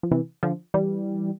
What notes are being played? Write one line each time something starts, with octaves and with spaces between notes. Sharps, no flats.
F3
C3 E3
D3 F3
E3 G3